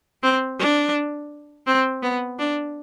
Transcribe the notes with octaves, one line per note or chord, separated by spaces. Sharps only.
C4
D4
C4
B3
D4